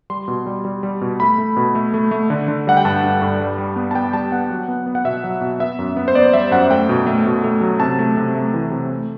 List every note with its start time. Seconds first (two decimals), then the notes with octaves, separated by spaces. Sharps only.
0.10 G3 C6
0.28 B2
0.46 G3
0.65 G3
0.83 G3
1.01 B2
1.20 A3 B5
1.38 A3
1.57 B2
1.75 A3
1.94 A3
2.11 A3
2.30 D3
2.48 D3
2.67 G3 F#5
2.77 G5
2.85 G2 A5
3.03 G2
3.22 G2
3.40 G3
3.58 G3
3.76 B3
3.91 A5
3.95 B3 G5
4.13 G3 A5
4.32 B3 F#5
4.50 F#3
4.68 B3
4.86 B3
4.95 F#5
5.05 B2 E5
5.24 F#3
5.41 B2
5.60 B3 E5
5.79 F#2
5.97 B3
6.08 C5
6.15 B3 D5
6.33 G3 E5
6.51 F#2 F#5
6.71 A3 G5
6.89 B2
7.07 A3
7.25 B2
7.44 A3
7.61 F#3
7.80 C3 A5
7.99 A3
8.17 C3
8.35 A3
8.54 E3
8.71 C3
8.90 A3